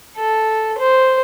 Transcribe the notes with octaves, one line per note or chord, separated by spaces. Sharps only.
A4
C5